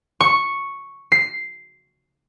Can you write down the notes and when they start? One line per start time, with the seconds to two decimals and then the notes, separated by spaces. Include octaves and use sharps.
0.20 C#6
1.12 C7